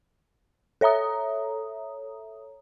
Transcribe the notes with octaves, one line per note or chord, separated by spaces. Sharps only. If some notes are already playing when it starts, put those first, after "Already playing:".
A4 C#5 E5 A#5 D#6